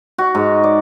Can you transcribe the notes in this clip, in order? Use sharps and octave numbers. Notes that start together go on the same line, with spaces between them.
F#4
G#2
D5